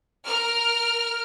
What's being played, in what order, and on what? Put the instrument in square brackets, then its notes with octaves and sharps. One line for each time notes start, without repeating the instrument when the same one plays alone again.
[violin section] A#4 F6